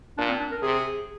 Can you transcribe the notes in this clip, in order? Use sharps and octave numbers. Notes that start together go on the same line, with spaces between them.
A#2 D4
C4
D4
A#4
C3 G#4